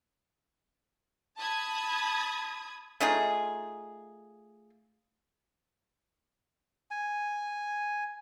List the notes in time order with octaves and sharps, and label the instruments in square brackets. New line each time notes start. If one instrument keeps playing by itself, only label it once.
[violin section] A5 B5 D#6 G#6
[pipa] A3 D#4 F4 G#4
[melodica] G#5